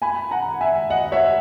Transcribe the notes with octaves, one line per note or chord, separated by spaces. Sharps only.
G#5 B5
F#5 A#5
E5 G#5
D#5 F#5
C#5 E5